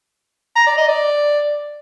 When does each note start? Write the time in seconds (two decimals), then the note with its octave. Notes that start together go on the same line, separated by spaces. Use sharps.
0.56 A#5
0.67 D5
0.77 D#5
0.88 D5